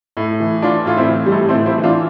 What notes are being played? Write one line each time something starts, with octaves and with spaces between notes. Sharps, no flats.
A2
E3
E3 D4 F4
A2 F4
C4 E4
E3
G3
A2 A3
A3 C4
E3
C4 E4
E3
D4 F4